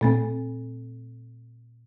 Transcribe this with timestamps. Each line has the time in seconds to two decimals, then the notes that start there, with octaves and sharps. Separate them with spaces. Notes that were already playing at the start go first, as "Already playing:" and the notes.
0.01 A#2 A3 C4